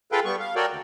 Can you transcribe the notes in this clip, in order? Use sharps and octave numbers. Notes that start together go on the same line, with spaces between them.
F4 G#4 A4 B4 F5 G5
G3 B3 C#6
F5
F#4 A4 A#4 C#5 D5 G5
D2